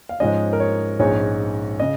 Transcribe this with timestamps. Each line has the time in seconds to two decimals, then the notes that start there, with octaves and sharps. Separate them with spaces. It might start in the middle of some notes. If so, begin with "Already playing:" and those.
0.09 F5
0.20 G#2 F3 G#3 C#4 D#5
0.53 A#4
0.60 C#5
0.99 A#1 G#2 G#3 C#4 C#5
1.80 C#3 D#5